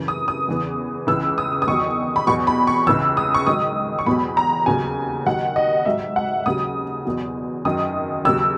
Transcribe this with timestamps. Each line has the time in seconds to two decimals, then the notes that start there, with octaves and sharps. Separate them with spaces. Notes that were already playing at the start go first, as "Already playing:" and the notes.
Already playing: F#2 C#3 E3
0.08 D#6
0.28 D#6
0.48 E2 C#3 E3
1.07 C#2 C#3 E3 E6
1.38 D#6
1.62 D#6
1.67 E2 D#3 F#3 C#6
2.16 B5
2.27 E2 B2 F#3 C#6
2.47 B5
2.67 C#6
2.87 C#2 C#3 E3 E6
3.17 D#6
3.34 C#6
3.47 G#2 D#3 F#3 D#6
3.99 C#6
4.06 E2 B2 F#3 B5
4.37 A#5
4.66 D#2 C#3 F#3 G#5
5.25 D#2 D#3 F#3 F#5
5.56 D#5
5.85 G#2 F#3 E5
6.16 F#5
6.46 D#2 C#3 F#3 D#6
7.05 E2 B2 F#3
7.65 F#2 D#3 F#3 D#6
8.25 D#2 C#3 F#3 E6